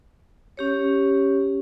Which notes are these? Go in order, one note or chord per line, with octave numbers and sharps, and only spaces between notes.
C#4 G4 C#5